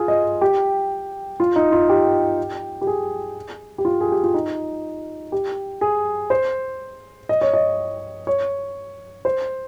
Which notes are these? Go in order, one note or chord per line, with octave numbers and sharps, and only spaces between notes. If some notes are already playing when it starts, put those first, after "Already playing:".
Already playing: F4 G#4
D#5
G4
F4
D#4
F4
G4
G4
G#4
G4
F4
G#4
G4
F4
D#4
G4
G#4
C5
D#5
C#5
D#5
C#5
C5